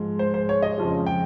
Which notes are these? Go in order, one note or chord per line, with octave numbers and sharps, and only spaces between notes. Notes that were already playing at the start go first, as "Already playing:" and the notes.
Already playing: G#2 F3 G#3
C5
C5
C#5
D#5
F2 C#3 F3 G#3
G5